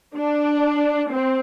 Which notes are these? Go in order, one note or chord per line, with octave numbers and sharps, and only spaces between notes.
D4
C4